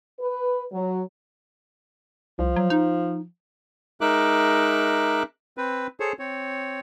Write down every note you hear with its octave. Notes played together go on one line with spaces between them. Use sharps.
B4
F#3
C2 F3
F#3
D#4
G#3 D#4 A#4 E5 D6 F#6
C4 B4
G#4 A4 C5 C#5
C4 C#5